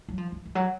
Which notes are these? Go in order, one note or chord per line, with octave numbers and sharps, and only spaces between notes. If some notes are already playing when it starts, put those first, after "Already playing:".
F#3
F3
F3
E3
F#3